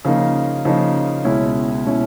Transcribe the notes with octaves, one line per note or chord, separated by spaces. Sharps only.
C#3 F3 A#3 D#4
C#3 F3 A#3 D#4
C#2 B2 G#3 C#4 E4
B2 G#3 C#4 E4